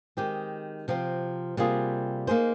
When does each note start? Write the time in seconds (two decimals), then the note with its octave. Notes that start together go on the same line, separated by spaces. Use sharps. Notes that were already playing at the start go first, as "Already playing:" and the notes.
0.17 D#3 G#3 C4 G4
0.88 C3 F3 C4
1.57 C3 G3 A#3 F4 G#4
2.27 A#3 D#4 G#4 C5